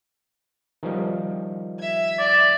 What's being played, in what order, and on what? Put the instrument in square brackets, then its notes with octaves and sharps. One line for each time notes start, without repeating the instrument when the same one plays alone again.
[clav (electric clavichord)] D#3 F3 G3
[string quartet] E5 G#6
[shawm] D5